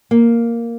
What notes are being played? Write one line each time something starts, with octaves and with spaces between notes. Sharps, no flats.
A#3